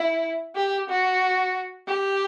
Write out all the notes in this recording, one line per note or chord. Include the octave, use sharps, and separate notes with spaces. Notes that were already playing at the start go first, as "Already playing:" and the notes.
Already playing: E4
G4
F#4
G4